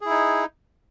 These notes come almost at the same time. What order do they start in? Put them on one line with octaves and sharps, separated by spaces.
G#4 E4 D#4